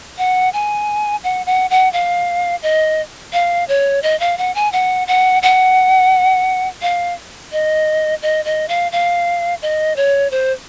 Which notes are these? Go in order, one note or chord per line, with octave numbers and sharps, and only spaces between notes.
F#5
G#5
F#5
F#5
F#5
F5
D#5
F5
C#5
D#5
F5
F#5
G#5
F#5
F#5
F#5
F5
D#5
D#5
D#5
F5
F5
D#5
C#5
C5